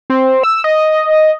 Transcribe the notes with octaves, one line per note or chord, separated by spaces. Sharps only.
C4
E6
D#5